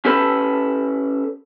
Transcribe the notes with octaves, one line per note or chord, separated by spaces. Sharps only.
C#4 G4 A4 B4 A5 B5